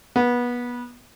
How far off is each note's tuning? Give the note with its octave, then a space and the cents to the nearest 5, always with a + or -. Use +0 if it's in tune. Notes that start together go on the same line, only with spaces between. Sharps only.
B3 -25